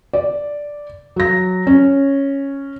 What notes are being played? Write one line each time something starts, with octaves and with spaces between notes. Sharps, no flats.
D5
F#3 A#6
C#4